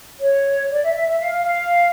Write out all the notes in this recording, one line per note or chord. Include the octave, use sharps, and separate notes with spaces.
C#5
D5
E5
E5
E5
F5
F5